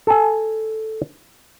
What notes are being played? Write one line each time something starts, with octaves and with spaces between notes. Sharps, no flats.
A4 G#5